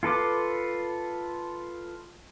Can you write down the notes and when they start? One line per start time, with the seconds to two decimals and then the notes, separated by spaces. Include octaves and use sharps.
0.03 F4 A4 B4 D6